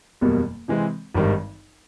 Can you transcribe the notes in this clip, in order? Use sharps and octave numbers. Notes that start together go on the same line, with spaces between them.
F#1 E2 B2 G3 A#3
C3 E3 G#3 C4
G#1 G2 D#3 G3